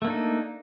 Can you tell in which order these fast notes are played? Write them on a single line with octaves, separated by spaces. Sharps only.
A3 A#3 D4 D#4